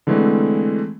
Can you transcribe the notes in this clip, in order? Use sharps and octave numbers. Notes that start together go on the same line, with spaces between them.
D3 E3 G#3 A3 C4